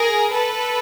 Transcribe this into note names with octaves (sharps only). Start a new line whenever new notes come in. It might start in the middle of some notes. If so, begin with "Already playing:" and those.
Already playing: G#4 A#4
A4 B4